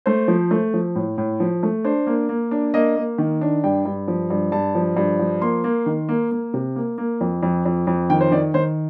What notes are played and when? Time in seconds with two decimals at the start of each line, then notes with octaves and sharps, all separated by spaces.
0.06 A3 C5
0.28 F3
0.51 A3
0.74 F3
0.95 A2
1.18 A2
1.40 F3
1.63 A3
1.84 D4 C5
2.07 A#3
2.29 A#3
2.51 D4
2.74 A#3 D#5
2.96 A#3
3.18 D#3
3.41 D4
3.64 G2 G5
3.85 G2
4.08 F3
4.30 G2
4.52 G2 A5
4.75 F3
4.97 G2
5.19 F3
5.41 A#3 C6
5.64 A#3
5.86 D#3
6.09 A#3
6.32 A#3
6.54 C3
6.76 A#3
6.98 A#3
7.21 F2
7.43 F2
7.66 F2
7.87 F2
8.10 D#3 G5
8.21 C5
8.32 D#3 D5
8.54 D#3 C5